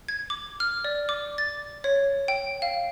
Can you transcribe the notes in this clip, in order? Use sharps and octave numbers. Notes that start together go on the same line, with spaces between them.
G#6
D6
F6
D5
D6
A6
C#5
G5
F5